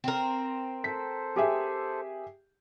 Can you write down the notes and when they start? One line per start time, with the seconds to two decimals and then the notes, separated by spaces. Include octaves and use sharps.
0.04 C4 A#4
0.84 A4 C5 B6
1.36 G4 G#4 E5